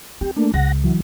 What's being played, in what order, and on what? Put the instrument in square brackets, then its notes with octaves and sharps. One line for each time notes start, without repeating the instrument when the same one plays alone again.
[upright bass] C4 [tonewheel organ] G4
[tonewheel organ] A3 A#3 D4
[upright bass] C#2 [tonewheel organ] F#5 A#6
[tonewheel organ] E3 F#3